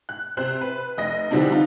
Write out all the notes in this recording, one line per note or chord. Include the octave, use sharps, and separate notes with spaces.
F#6
C3 C5 F#6
B4
F1 D#5 A#6
D3 E3 G3 C4 D4 D#4
D#4 F4